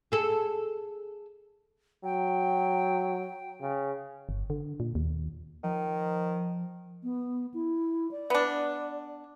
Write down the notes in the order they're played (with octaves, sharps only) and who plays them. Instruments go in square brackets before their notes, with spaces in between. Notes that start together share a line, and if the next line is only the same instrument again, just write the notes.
[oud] G#4 A4
[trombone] F#3 [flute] G5
[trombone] C#3
[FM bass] G1
D3
A#2
D#2
[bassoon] D#3 [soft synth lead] F3
[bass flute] B3
E4
D5
[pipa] B3 D4